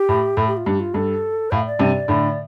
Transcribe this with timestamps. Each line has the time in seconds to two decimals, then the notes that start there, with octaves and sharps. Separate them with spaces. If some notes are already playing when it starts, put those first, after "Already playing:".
Already playing: G4
0.09 A2
0.37 A2 A4
0.47 G4
0.57 F4
0.66 G2 G4
0.80 F4
0.94 G2 A4
1.52 A2 F5
1.66 D5
1.79 G2 C3
2.08 A2 D3